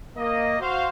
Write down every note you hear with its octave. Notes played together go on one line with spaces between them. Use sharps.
A#3 D#5
F#4 C5 F5